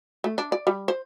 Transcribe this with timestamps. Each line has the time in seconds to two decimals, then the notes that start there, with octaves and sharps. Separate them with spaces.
0.24 A3
0.38 D4
0.52 D5
0.67 G3
0.88 C5